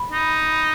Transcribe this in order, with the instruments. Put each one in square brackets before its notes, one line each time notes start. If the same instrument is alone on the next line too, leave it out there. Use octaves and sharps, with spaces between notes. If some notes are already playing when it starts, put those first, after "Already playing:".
Already playing: [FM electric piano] B5
[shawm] D#4